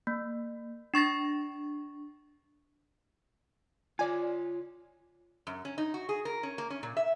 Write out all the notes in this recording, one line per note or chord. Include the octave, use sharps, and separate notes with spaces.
A#3
D4 C#6 A6 A#6
F4 C#5 D5 G#5
F#2
C#4
D#4
F#4
G#4
A#4
C#4
A#3
C#4
A#2
E5